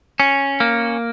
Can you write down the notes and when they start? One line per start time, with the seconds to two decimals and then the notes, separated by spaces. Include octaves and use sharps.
0.20 C#4
0.60 A#3